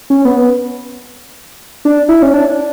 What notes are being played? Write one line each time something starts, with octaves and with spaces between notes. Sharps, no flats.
C#4
B3
D4
E4
C#4
D4
D4